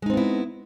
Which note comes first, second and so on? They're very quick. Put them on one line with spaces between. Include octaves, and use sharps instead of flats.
G#3 D#4 C4 B3 E4